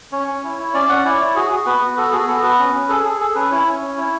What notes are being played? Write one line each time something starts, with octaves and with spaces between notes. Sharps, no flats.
C#4 C#5
C#4
E4
E4
C#4 D5
C#4 F#5
E4 D5
E4 C#5
F#4 G#4
F#4 G#4
B3 B4
B3
F#4 A4
F#4 G#4
B3 A4
F#4 B4
C#4
C#4
G#4 A4
G#4
G#4 A4
C#4 B4
E4 C#5
C#4
C#4
E4